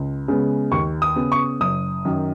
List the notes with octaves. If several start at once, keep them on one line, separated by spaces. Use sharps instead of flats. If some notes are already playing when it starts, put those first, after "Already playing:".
Already playing: C#2
C#3 G#3 B3
D#2 C#6
D#6
C#3 B3
C#6
F#1 D#6
F#2 D#3